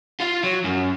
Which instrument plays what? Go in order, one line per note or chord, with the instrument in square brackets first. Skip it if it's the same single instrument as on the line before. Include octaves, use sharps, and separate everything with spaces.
[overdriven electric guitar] F4 F5
F#3
F#2